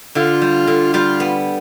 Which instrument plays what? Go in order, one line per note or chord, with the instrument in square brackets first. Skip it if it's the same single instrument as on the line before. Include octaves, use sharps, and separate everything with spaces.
[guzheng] D3 [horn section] F4
[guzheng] G3
D3
[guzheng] G3 [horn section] F4
[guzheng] B3